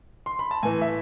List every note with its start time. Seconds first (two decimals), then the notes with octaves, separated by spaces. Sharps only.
0.26 C6
0.39 B5
0.51 A5
0.63 A2 E3 G#5
0.81 E5